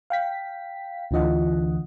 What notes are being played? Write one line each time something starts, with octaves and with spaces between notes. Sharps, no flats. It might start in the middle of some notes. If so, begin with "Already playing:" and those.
F5 G5 B6
D2 D3 E3 F4 D#5 F#5